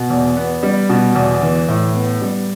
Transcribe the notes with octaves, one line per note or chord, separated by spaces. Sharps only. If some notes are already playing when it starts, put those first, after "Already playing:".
Already playing: B2
E2
B3
G3
B2
E2
E3
A2
B3
G3